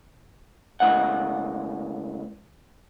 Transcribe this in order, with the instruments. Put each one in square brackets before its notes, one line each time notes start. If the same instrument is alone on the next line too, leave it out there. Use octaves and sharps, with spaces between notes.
[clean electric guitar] C#2 A2 C#3 F#5